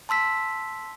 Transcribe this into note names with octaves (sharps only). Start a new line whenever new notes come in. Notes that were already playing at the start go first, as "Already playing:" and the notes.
A5 C6 E6 B6